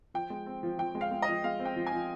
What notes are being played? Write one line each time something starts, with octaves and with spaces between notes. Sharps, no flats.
F3 G5
G#3
C4
F3
F3 G5
G#3
F5
G#3
D#5
F3
G#3 F5
C4
G5
F3
G#5
F3